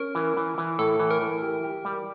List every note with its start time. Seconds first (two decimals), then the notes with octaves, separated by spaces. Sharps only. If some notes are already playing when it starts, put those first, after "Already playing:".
Already playing: C#4 A#4
0.15 E3
0.37 E3
0.58 E3
0.79 A2 A4
1.00 E3
1.10 A#4
1.22 E3
1.43 G4
1.64 G4
1.85 G3